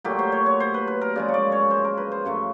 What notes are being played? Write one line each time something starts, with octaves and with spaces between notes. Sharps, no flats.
A#2 F#3 A3 G4
C5
C#5
C#5
C5
B4
B4
A#4
C#3 F3 G#3 D5
C#5
D5
C#5
C5
A#4
B4
C5
F#2 C#3 F3 A3 C#5